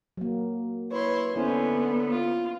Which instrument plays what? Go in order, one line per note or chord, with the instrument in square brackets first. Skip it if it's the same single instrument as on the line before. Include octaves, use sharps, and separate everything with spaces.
[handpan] F#3 A#3
[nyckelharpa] E4 C6 [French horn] B4 [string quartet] C#5
[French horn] D3 [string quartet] B3 [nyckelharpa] C#4 [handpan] E4 C5
[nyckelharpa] F4